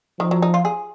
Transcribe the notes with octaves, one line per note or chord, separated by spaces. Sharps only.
D#3 F3
F#3
D#4
F4
G#4